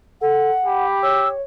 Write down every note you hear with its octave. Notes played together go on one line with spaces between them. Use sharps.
A4 F#5
G4 B5
C#5 E6